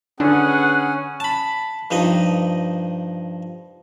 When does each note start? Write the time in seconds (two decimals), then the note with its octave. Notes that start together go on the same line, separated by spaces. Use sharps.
0.20 D3 C#4 D4 G#4 B4 F#5
1.20 A5 B5
1.91 G2 F3 D#4 D#5